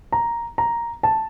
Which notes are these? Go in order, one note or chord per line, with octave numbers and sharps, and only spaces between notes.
A#5
A#5
A5